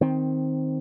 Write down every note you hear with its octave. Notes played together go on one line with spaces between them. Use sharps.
D#3 C4